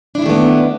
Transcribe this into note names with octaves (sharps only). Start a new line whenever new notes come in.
D#3 A3 B3 D4 E4